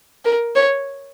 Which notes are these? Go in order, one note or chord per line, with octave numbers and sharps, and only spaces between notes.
A#4
C#5